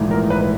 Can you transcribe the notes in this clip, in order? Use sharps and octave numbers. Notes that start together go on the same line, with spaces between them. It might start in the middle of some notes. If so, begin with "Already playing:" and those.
Already playing: A#1 G#2 E3 A3
A#4
B4